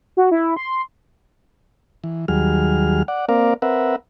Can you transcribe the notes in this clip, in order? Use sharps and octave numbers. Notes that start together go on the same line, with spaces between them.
F#4
E4
C6
E3
D#2 F#3 G3 G#4 F6
D5 F#5
A#3 C4 A#4 D5 F5
C4 A#4 B4 E5 F#5